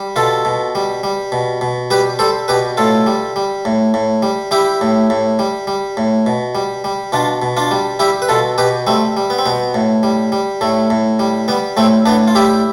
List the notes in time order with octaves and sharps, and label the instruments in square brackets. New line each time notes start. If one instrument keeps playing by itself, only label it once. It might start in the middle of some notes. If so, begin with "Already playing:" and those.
Already playing: [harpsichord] G3
B2 F4 A4
B2
G3
G3
B2
B2
G3 G4 B4
G3 A4 C5
B2 G4 B4
A2 F4 A4
G3
G3
A2
A2
G3
G3 E4 G4
A2
A2
G3
G3
A2
B2
G3
G3
B2 D4 F4
B2
D4 F4
G3
G3 E4 G4
B4
B2 F4 A4
B2 G4 B4
G3 A3 C4
G3
B3
C4
B2 B3
A2
G3
G3
A2 A3
A2
G3
G3 B3
A2 A3 C4
A2 B3 D4
F4
G3 E4 G4